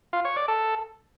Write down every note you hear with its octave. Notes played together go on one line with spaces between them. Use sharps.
F4
C#5
D5
A4